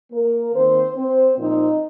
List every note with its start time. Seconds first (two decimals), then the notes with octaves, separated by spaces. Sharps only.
0.12 A#3 A#4
0.54 D#3 A#3 C4 C5
0.96 C4 C5
1.38 A#2 F3 C4 D#4